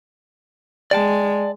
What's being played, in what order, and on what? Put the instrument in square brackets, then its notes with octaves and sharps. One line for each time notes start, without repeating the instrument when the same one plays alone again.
[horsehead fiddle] G#3 [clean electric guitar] D5 G5 A5